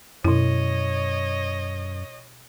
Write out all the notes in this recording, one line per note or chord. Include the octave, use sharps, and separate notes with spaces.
F#2 B2 E4 C#5 D#5